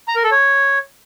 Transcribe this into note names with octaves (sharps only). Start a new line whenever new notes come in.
A#5
A#4
A4
C#5